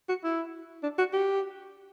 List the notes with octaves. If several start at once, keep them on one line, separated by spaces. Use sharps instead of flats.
F#4
E4
D4
F#4
G4